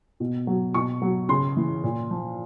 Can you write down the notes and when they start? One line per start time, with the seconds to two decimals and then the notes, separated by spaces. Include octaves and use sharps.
0.20 B2
0.47 F#3
0.74 B2 C#6
1.02 F#3
1.29 C#3 C6
1.57 E3
1.83 A#2
2.11 F3